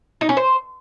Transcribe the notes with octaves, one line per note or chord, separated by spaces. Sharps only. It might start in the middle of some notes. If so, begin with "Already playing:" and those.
D#4
C#4
C5